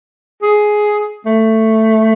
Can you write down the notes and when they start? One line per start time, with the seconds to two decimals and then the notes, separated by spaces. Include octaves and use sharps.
0.42 G#4
1.26 A3